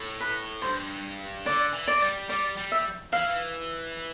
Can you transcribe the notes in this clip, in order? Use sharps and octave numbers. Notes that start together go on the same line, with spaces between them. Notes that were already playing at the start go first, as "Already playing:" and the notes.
Already playing: A2
B4
G2 C5
D3 D5
E3
D5
G3
G3 D5
G3
E5
E3 F5